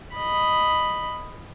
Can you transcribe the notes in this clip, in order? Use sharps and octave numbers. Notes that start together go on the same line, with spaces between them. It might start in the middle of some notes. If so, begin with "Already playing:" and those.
D#5 B5